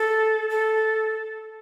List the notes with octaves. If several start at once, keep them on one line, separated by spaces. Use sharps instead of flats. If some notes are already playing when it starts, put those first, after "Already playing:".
Already playing: A4
A4